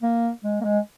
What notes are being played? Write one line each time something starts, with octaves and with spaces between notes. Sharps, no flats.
A#3
G#3
A#3
G#3